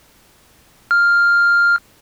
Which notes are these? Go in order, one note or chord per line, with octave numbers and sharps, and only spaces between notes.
F6